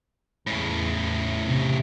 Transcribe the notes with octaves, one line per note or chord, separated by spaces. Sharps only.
E2 A2 C#3
C3